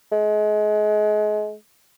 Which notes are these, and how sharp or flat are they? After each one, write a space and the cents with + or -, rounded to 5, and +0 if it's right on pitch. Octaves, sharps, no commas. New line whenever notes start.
G#3 +30